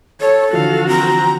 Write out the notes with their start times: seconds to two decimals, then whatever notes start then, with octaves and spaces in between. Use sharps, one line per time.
0.20 A4 C#5
0.53 D3 E3 F3 F#4 F5
0.88 C4 A#5